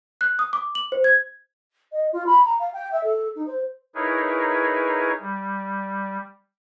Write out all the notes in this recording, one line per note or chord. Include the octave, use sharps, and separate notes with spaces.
F#6
D#6
D6
F#7
C5
G#6
D#5
F4
B5
A#5
F5
G5
E5
A4
D#4
C5
D#4 E4 G#4 A#4 B4 C#5
G3